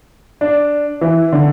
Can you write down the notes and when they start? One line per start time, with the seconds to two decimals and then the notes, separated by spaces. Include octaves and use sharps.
0.41 D4
1.01 E3
1.32 D3